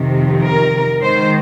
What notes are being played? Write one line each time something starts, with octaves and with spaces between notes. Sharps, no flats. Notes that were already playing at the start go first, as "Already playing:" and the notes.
Already playing: F2 C3 D#3
A#4
G#2 D#3 C5